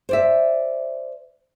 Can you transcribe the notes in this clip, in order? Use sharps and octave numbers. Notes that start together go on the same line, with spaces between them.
C5 D5 E5